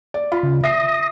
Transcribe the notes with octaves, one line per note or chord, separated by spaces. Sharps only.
D5
F4 B5
C#3
E5 D#6 A#6 C7